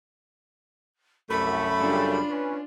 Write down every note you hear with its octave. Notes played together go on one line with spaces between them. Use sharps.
C2 F#2 A3 B5
C#3 G3 D4 F4
C#4 B4